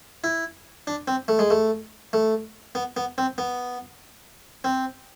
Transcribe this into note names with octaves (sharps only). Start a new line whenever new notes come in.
E4
D4
C4
A3
G#3
A3
A3
B3
B3
C4
B3
C4